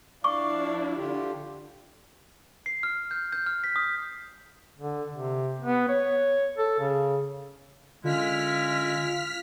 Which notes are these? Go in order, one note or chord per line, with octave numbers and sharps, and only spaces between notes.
F3 D4 E4 D5 F5 C#6 D6
D3 F4 G4
C7
F6
G6
G6
F6
B6
D#6
D3
C3
B3
C#5
A4
C#3
D3 G#3 C#4 E4 F4 F6 B6